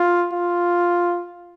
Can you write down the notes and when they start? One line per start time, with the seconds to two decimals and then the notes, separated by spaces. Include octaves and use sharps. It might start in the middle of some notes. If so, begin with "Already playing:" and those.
Already playing: F4
0.33 F4